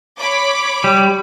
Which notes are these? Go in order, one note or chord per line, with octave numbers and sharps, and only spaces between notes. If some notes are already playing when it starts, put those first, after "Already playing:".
C#5 B5 D6
G3